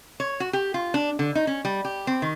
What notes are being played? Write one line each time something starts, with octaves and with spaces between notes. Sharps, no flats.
C#5
F#4
G4
F4
D4
D3
D#4
C#4
G3
G4
C4
D#3